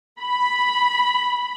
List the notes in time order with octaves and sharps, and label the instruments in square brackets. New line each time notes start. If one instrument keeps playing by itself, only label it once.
[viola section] B5